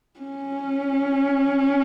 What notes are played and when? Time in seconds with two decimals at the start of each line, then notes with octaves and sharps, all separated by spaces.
0.20 C#4